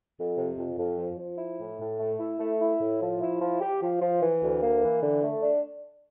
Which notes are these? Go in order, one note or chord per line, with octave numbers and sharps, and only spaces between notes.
F2
C3
F2
F2
F3
F3
E4
A2
A2
A3
E4
A3
E4
A2
F3
E4
F3
G4
F3
F3
E3
D2
A#3
E3
D3
A3
D4